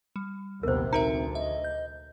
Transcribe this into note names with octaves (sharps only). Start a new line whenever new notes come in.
G3
A#1 D#2 C3 B3 A#4 C5
D2 C4 D#4 A#4 E5 A#5
D#5 E5
G6